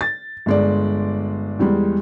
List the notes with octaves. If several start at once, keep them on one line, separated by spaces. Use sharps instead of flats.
A6
G1 G#3 D5
E2 G3 G#3